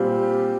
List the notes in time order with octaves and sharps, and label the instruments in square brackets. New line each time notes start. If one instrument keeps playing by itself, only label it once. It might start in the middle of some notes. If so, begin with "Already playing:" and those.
Already playing: [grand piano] A#2 G3 C4 F4 [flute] G4